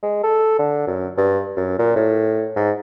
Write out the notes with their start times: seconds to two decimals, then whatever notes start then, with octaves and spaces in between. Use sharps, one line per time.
0.03 G#3
0.23 A4
0.59 D3
0.87 F#2
1.17 G2
1.57 F#2
1.78 A#2
1.96 A2
2.56 G#2